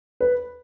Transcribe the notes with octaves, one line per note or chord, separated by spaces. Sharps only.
B4